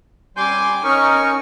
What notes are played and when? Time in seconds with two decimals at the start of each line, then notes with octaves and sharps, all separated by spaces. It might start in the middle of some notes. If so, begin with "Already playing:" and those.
0.37 G3 G#5 C6 D6 G6
0.83 C#4 D#4 A#4 G#5 C#6